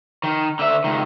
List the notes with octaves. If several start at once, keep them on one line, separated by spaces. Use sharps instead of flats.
D#3
D3 E5
C#2 D#3